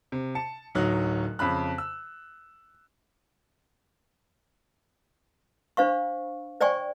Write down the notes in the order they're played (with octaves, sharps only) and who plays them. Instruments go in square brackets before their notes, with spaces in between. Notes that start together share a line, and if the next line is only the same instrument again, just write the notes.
[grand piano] C3
A5 C#7
D1 F#3 D#4 F#6
F2 C#3 B5 F#6
E6
[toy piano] D4 C5 F5 C#6
C5 D5 G5 G#5 C#6